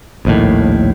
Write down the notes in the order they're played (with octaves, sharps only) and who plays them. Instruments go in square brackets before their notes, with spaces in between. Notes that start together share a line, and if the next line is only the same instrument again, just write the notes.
[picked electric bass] A#1 D#2 A2